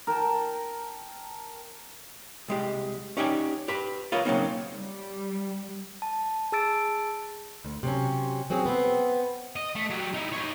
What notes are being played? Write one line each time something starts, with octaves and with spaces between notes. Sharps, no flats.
A#4 G5 A5
C2 G#3 G4
C#4 D#4 G4 D5 F#5 G#5
G4 B4 B5
F4 A#4 B4 C#5 D#5
C#3 E3 F#3 A#3 C4 D#4
G3
A5
G#4 A5 E6 A6 D7
D2
C3 F#3 C#4
F#3 C4 C#4 G#4
B3 C4
D#5
A3
F#3 G3
D#4 E4
D#4 C#5